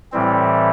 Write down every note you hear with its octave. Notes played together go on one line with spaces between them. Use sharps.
A2 E3 G3 C4